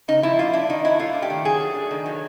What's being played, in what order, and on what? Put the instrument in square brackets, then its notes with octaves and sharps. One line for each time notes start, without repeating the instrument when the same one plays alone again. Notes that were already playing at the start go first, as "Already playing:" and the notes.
[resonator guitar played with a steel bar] C#3 D#4
F3 E4
A#3 F4
D4 E4
D#3 D#4
F#3 E4
A3 F4
D4
G4
D#3
F#3 G#4
A3
D4
D#3
F#3